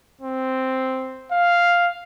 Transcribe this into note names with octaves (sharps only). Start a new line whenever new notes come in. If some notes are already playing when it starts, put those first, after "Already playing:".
C4
F5